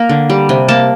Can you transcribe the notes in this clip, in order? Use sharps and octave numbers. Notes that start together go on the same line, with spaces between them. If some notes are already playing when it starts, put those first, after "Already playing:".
Already playing: A#3 A#5
D3
G3
C3
A#3 A5